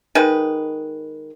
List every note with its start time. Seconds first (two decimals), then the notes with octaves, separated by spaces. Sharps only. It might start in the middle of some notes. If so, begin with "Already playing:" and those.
0.15 D#3 G#3 B4